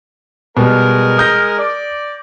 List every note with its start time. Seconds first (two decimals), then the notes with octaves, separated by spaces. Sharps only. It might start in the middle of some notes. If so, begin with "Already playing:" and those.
0.57 B2 G3 G#3 A#4
1.18 D#6 G6 A#6
1.58 D5